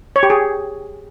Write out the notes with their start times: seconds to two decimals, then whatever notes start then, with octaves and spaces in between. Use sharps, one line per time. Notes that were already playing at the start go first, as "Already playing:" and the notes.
0.16 C#5
0.23 G4
0.30 G#4